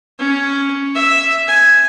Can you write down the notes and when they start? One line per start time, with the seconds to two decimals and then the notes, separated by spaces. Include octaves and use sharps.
0.19 C#4
0.95 E5
1.47 G#5